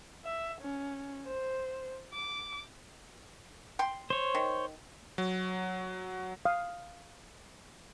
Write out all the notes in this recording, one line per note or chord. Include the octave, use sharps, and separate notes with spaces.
E5
C#4
C5
D6
G5 C6
C5 C#5
D#3
F#3
F5 D#6